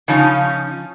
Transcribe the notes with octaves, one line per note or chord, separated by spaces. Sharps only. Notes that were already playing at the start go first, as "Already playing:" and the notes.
C#3 F3 C#4 D#4